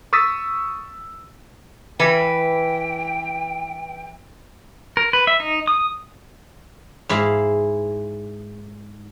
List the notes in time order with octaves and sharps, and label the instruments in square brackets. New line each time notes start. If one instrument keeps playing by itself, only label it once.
[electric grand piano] C#6 D#6 E6 A6 B6 D#7
[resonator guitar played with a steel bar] E3 B4 [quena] G5
[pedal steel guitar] A#4
B4
E5
D#4
D#6
[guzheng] G#2 E4 G#4 F5